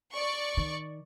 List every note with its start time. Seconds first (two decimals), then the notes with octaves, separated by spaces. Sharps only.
0.13 D5 C#6
0.57 D#3